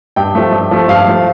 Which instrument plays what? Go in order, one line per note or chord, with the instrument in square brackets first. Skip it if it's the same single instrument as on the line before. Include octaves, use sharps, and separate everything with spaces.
[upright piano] G2 G5
F3 A3
G2
F3 A3
G2 F5
F3 A3